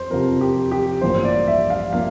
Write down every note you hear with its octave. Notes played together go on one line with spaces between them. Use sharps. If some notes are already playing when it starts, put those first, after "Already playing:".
Already playing: F2 F3 C5
F2 C3 F3 A#4
G4
G4
A1 G2 F3 A#3 C5
D5
E5
F5
F3 A#3 F5